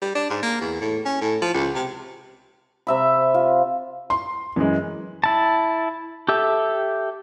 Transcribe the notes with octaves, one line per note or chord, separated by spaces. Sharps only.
G3
D4
G#2
A#3
E2
A2
C#4
A2
F3
C#2
C3
C3 E5 B5
F4
C6
F#2 E3 G#3
E4 A5
G4 A4 E5